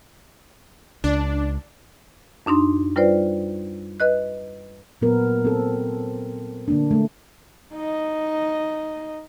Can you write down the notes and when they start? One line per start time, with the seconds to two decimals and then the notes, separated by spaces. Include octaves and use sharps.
1.04 C#2 D4
2.46 F#2 D4 D#4 C6
2.96 G3 F4 B4 C5 D5
4.00 B4 D#5 F#6
5.02 A#2 F#3 B3 A#4
5.45 C4 A4
6.68 D3 A#3 D4
6.91 G#3 A3
7.73 D#4 D#5